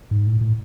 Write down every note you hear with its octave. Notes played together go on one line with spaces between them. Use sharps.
G#2
A2
A2